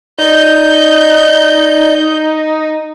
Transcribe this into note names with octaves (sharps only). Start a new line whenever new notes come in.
D#4 D5 D#5 G6